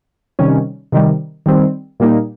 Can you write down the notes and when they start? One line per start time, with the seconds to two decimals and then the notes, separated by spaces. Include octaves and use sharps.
0.39 C3 D#3 G3 C#4
0.92 C3 D#3 G3
1.46 D#3 G3 C4
2.00 A#2 G3 A#3 D#4